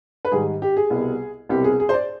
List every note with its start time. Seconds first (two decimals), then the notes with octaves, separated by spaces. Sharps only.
0.25 B4
0.32 G#2 D#3 G3 G#4
0.62 G4
0.77 G#4
0.90 C2 B2 G3 B3
1.49 C2 B2 G3 C4 G4
1.64 G#4
1.80 G#4
1.89 C5
1.94 D5